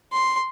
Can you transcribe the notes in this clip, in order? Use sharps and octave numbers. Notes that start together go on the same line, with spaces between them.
C6